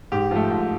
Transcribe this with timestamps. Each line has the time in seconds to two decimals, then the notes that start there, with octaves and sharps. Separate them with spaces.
0.12 G#2 G4
0.31 F3 A3
0.50 G#2